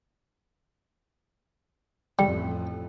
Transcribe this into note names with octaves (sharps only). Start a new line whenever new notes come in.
A1 F2 G3 G5